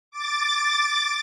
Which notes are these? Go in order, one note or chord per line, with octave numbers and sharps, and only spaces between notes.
D6 A6